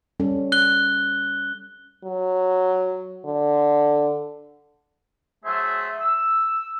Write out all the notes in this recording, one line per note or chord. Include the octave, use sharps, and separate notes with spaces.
G3 C#4 A4
F#6 G7
F#3
D3
F#3 A3 G#4 C5 E5
E6